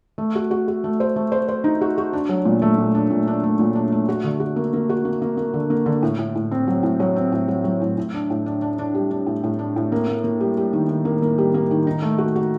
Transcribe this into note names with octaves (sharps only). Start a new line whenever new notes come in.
A3
F#4
F#4
F#4
A3
C5
A3
C5
C5
D#4
F#4
F#4
D4
F#3
A#2
A3
A#2
D4
A#2
D4
A3
A#2
D4
A3
F#4
D3
F#4
A#3
A#3
F#4
A#3
A#3
A#3
D3
A#3
D3
A2
A2
A2
C4
F#3
A2
F#3
C4
A2
F#3
F#3
A2
A2
D4
A2
D4
D4
D4
G3
D4
A2
A2
D4
A2
A#3
A#3
A#3
G3
G3
D#3
D#3
A#3
A#3
G3
A#3
D#3
D#4
A3
F#4
F#4